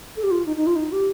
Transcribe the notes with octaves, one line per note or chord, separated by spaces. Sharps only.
A4
G4
F4
D#4
D#4
F4
D#4
G4